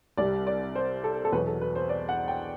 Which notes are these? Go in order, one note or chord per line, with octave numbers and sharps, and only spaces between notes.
C2 C3 G3 D5
D5
C5
A4
A4
E2 B2 F#3 B4
A4
B4
C5
D5
F#5
G5